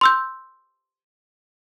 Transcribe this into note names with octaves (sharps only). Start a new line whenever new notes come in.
C6 E6 G6